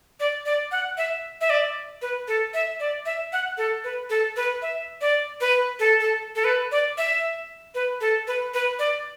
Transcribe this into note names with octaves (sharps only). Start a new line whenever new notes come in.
D5
D5
F#5
E5
E5
D5
B4
A4
E5
D5
E5
F#5
A4
B4
A4
B4
E5
D5
B4
A4
A4
A4
B4
D5
E5
B4
A4
B4
B4
D5